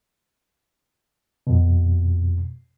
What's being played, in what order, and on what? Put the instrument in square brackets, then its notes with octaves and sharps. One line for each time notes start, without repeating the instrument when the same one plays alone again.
[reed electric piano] F2 B2